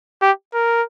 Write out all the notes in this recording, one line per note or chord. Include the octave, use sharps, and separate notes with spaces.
G4
A#4